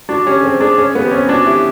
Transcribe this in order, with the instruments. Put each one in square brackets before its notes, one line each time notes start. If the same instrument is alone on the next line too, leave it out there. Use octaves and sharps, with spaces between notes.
[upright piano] D4 [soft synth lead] F#4
[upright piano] C#4 [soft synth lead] G4
[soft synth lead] A4
[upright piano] C4 [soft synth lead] G#4
[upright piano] D4 [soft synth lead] G#4
[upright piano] C#4 [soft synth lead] G#4
[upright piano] B3
[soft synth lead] G4
[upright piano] C4
C#4
[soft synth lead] F#4
[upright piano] D4
[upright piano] E4 [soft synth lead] G4